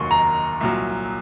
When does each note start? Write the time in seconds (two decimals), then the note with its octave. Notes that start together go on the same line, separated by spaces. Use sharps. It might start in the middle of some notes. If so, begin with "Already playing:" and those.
Already playing: F1 D#2 D#3 F#3 C6 C#6
0.11 A#5
0.61 C2 A#2 F#3